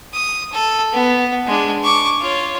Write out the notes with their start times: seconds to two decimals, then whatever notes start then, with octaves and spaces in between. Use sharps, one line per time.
0.13 D#6
0.52 A4
0.93 B3
1.46 G#3 D4
1.83 C#6 D6
2.20 F4 C#5